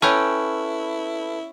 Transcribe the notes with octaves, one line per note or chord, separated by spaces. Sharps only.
C#4 E4 A4 B4 G5